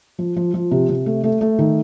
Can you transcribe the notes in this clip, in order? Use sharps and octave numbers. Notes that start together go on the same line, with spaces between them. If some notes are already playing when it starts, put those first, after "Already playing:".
F3
F3
F3
C3
C3
A3
A3
A3
D#3